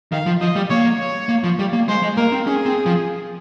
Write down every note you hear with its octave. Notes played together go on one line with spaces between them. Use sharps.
D#3 F5
F3
F3 D#5
G3
A#3 C#5
C#5
A#3
F3
G3
A#3
G#3 C5
G#3
A#3 A#4
C4
C#4 G#4
C4
F3